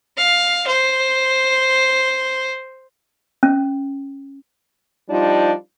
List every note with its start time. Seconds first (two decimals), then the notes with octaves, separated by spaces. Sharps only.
0.18 F5
0.67 C5
3.43 C#4
5.09 F3 G3 D4 D#4 F4